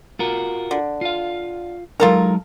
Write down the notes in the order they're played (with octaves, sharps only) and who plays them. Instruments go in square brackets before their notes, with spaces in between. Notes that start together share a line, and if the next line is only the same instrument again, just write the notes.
[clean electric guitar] F4 F#4 A#4
[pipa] D3
[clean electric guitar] F4 F5
[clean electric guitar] F#3 G#3 D#4 [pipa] F4 A4 A#4